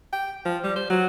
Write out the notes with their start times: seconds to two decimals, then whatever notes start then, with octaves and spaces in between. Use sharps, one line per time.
0.13 G5
0.45 F3
0.64 G3
0.76 C5
0.90 F#3